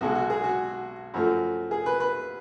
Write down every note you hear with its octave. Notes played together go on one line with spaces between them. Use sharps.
B1 B2 G#3 F#4
F#4
G#4
F#4
F#2 F3 A3
G#4
B4
B4